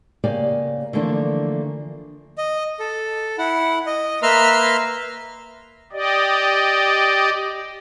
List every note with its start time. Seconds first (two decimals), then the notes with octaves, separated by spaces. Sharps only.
0.24 C#3 A#3 G4 D5 G#5
0.93 D3 E3 F3 A3 A#3 D4
2.38 D#5
2.80 A4
3.38 E4 F#5
3.86 D#5
4.23 A#3 B4 E5 A#5 C6 F6
5.92 G4 D5 D#5